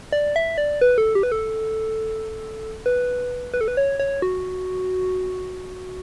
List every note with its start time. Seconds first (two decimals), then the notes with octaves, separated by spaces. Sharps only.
0.12 D5
0.36 E5
0.58 D5
0.81 B4
0.98 A4
1.15 G4
1.23 B4
1.32 A4
2.86 B4
3.54 B4
3.61 A4
3.68 B4
3.77 C#5
4.00 C#5
4.22 F#4